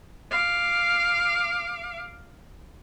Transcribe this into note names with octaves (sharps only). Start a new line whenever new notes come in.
F5 D6